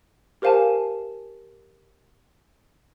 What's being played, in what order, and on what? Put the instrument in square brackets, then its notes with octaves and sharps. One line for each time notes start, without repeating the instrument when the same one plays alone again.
[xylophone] G4 A#4 C5 F5 G#5 A5